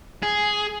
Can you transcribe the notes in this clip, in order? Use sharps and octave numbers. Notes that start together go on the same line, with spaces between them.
G#4